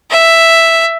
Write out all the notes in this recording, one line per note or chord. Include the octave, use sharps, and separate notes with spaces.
E5